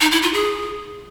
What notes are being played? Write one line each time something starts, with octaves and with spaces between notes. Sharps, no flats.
D#4
E4
F4
G#4